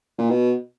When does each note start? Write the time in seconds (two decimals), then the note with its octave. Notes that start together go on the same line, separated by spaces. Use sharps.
0.18 A#2
0.30 B2